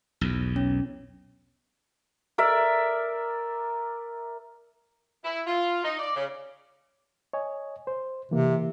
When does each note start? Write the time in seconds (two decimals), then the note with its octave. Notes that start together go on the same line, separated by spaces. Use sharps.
0.21 B1 E2
0.56 C#4
2.38 A#4 D5 E5
5.23 E4
5.46 F4
5.83 D#4
5.98 D5
6.15 C#3
7.33 C#5 D#5 G#5
7.87 C5
8.31 C3 E3 A#3